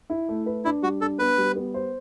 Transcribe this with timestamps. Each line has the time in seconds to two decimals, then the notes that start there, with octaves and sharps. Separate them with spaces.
0.10 E4
0.29 A3
0.46 B4
0.65 D4 E4
0.82 G3 F#4
1.01 D4 A4
1.19 B3 B4
1.38 G3
1.56 B3
1.74 C5